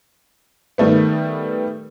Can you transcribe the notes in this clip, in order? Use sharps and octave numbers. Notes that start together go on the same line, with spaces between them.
D#3 G3 A3 B3